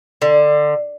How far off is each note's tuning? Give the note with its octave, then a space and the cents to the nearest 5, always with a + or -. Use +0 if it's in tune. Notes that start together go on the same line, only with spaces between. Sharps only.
D3 +20